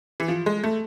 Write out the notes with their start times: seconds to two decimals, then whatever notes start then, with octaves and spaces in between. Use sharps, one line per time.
0.20 E3
0.28 F3
0.46 G#3
0.64 A3